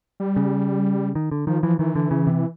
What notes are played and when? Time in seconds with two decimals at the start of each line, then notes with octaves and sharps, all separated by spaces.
0.20 G3
0.36 C#3
1.15 D#3
1.32 D3
1.47 D#3 F3
1.63 E3 F3
1.79 D#3 E3
1.96 D3
2.11 C#3
2.27 C3